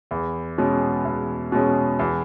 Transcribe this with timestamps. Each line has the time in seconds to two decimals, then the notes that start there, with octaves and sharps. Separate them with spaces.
0.11 E2
0.58 B2 G#3 C#4
1.05 E2
1.52 B2 G#3 C#4
1.99 E2